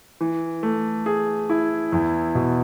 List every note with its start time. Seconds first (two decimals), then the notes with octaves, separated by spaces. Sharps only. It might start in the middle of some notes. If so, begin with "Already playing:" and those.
0.21 E3
0.63 A3
1.06 G#4
1.50 E4
1.92 E2
2.35 B2